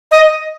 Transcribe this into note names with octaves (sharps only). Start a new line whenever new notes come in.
D#5